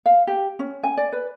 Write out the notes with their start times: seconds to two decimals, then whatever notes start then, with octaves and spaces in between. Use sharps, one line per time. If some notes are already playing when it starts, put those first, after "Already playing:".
0.06 F5
0.27 G4
0.59 C#4
0.83 G#5
0.97 D5
1.12 B4